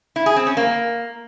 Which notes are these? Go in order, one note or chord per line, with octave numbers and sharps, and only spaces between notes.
E4
G#4
C4
C#4
A#3